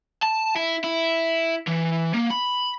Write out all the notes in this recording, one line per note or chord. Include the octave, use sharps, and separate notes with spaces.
A5
E4
E4
E3
A#3
B5